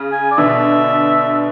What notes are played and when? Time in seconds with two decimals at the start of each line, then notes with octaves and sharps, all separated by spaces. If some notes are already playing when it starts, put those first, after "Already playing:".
Already playing: C#3
0.12 G#5
0.31 D5
0.38 B2 D3 E5